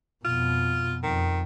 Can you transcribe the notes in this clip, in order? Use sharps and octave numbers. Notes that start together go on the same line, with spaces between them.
F2 B2 F4
F2 D#3